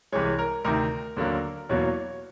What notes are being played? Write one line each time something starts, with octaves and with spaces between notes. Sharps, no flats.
C2 C3 E3 G#3 C#5
A#4
D2 C3 D#3 A#4
D#2 D3 F#3 A#3
E2 B2 F#3 A#3 C#5